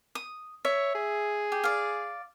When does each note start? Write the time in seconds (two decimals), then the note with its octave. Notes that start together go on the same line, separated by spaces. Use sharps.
0.15 D#6
0.65 C#5 E5
0.95 G#4
1.52 G4
1.64 D5 F5